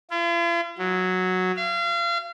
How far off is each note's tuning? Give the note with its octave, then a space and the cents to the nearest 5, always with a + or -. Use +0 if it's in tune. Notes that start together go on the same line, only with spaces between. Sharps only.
F4 -45
F#3 -5
F5 -35